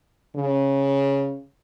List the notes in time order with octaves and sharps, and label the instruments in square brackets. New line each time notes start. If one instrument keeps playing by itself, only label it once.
[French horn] C#3